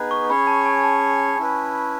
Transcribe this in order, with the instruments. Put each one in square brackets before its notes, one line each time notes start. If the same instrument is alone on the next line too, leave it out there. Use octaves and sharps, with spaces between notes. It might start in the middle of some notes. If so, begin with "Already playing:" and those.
Already playing: [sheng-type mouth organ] B3 D#4 G#4 B4
[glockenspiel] C#6
[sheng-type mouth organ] C#4 G#4 C#5 [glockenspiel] B5
[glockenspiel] A5
G#5
A5
[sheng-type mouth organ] C#4 E4 B4